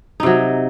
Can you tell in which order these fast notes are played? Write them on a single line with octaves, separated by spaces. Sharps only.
D#4 C3 F#3